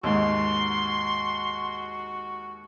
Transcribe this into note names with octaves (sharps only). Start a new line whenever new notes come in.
D#2 G#2 F#4 C6